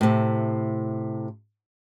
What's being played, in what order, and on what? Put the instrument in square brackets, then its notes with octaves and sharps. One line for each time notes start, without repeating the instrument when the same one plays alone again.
[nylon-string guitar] A2 C3